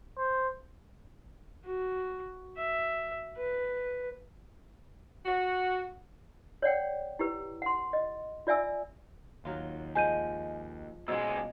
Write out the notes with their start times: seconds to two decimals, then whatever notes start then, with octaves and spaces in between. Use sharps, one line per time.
0.18 C5
1.65 F#4
2.58 E5
3.38 B4
5.26 F#4
6.62 C#5 D5 F#5 G5
7.19 E4 G4 B4
7.62 F#5 C6
7.93 D#5
8.47 F4 D5 E5 G#5 E6
9.45 D#2 F#3 F4
9.95 F3 G#3 G#5 G6 D#7
11.08 D2 B2 G#3 E6